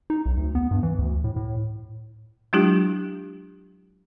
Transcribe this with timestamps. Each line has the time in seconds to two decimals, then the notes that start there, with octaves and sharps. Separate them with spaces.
0.10 D#4
0.26 B1
0.37 D2
0.55 B3
0.71 G2
0.83 E3
0.99 D2
1.24 A2
1.36 A2
2.53 F#3 G#3 D4 E4 F4 G4